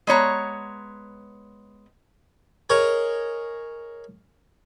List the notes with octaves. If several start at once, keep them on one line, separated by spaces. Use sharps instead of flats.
G#3 B3 C#5 A#5
G#4 A#4 C#5 D#5